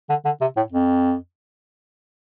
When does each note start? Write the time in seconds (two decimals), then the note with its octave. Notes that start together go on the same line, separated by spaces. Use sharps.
0.09 D3
0.25 D3
0.41 C3
0.57 A2
0.72 F2